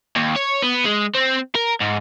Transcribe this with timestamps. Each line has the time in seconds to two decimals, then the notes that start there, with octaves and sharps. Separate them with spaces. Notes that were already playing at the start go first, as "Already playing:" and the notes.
0.16 D#2
0.36 C#5
0.62 B3
0.85 G#3
1.15 C4
1.55 A#4
1.80 G#2